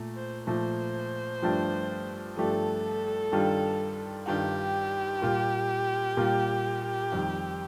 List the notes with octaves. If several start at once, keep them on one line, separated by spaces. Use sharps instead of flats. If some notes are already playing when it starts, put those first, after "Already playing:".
Already playing: A#2 A3
C5
A#2 F3 A3 C5
G2 F3 A3 D4 G4
G2 F3 A3 D4 G4 A4
G2 D#3 G3 D4 F4
G2 D#3 G3 D4 F4 G4
A#2 G3 A#3 F4
A#2 G3 A#3 F4
F2 D#3 G3